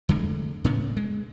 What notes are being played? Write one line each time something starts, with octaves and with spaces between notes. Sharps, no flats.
F2 D3 G#3 A3
A2 C#3 B3
G#3